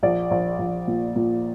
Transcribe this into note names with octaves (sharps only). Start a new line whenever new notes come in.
A#1 D5
A#1
A#1
A#2
A#2